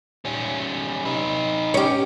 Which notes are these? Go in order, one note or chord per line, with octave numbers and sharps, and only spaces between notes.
G3 C#4
D#4 B4
C#4 G4